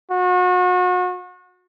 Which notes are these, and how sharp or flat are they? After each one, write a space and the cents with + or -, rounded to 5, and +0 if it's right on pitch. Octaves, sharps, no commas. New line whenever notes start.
F#4 -35